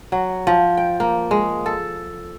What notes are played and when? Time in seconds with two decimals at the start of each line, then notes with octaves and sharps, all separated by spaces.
0.12 F#3
0.47 F3
0.77 G5
1.00 A#3
1.31 G#3
1.66 A4